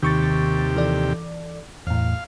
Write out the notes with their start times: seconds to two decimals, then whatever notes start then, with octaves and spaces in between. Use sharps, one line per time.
0.02 D#2 C3 D#3 G4 C#6 A6
0.76 E3 A4 D5
1.87 E2 A2 F5